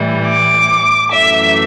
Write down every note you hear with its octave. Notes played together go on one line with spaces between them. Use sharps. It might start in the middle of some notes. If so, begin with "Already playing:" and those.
Already playing: A2 E3 G3
D6
F#2 E3 A3 E5